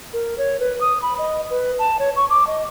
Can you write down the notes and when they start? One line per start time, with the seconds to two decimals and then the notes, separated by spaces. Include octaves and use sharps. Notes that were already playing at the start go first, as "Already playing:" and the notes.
0.13 A#4
0.38 C#5
0.60 B4
0.81 D#6
1.02 B5
1.18 D#5
1.50 B4
1.79 A5
1.99 C#5
2.16 C#6
2.30 D6
2.47 D#5